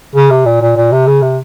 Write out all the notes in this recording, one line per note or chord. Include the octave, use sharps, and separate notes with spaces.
C#3
C3
A#2
A#2
A#2
C3
C#3
C3